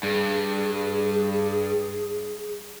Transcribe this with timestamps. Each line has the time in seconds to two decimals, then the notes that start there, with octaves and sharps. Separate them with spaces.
0.03 G2 G#4